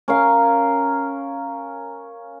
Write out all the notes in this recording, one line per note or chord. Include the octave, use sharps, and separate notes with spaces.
C#4 A#4 F5